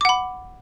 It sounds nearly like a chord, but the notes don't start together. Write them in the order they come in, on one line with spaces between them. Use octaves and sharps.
D6 F#5 B5